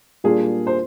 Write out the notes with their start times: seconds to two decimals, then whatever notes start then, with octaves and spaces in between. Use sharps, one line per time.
0.24 A#2 G3 A#3 D4 F4 G#4
0.67 C5